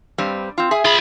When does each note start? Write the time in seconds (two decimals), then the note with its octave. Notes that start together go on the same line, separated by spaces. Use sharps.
0.18 G2 G3 C4
0.58 C4 F4
0.71 G#4 E5 G#5
0.85 F4 G#4 B5